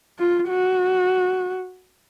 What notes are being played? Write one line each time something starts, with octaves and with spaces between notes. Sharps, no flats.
F4
F#4